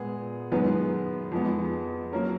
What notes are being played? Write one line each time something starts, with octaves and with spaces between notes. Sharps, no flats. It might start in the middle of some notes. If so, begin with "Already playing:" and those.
Already playing: A#2 G#3 B3 G#4
F#2 D#3 G#3 B3 B4
F2 F3 G#3 B3
F#3 A#3 C#4 A#4